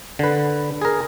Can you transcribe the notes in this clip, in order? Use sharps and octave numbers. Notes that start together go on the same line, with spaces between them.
D3 B4
G#4 A#4